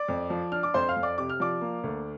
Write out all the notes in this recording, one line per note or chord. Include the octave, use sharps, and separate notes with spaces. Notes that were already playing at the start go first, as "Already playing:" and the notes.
Already playing: D5 D6
F2
F3
D4 F6
D6
F2 C5 C6
F5 F6
F2
D5 D6
C3 D6
F6
F3 D5 D6
A#3
D2